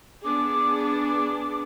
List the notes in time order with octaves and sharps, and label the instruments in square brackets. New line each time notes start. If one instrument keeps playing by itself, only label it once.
[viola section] B3 D4 G#4 [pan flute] D6